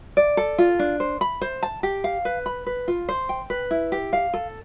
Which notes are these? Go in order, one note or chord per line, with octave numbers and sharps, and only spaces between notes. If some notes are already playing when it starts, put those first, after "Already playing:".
D5
A4
F4
D4
C5
B5
C5
A5
G4
F5
B4
B5
B4
F4
C5
G5
B4
E4
G4
F5
A4